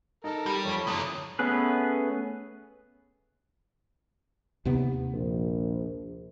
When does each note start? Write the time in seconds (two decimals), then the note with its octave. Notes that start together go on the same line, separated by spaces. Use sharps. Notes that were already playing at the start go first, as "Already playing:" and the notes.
0.24 D#4 A4 A#4
0.46 G3 G4
0.65 F2 F3 C#5 B5
0.87 F#1 F#2 D3 E3 C#4 D#6
1.39 A3 B3 C#4 G#4 B4
4.65 D#2 C3 B3
5.14 A#1